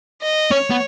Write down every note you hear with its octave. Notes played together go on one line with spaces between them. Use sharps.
D#5
C#4 C#5
B3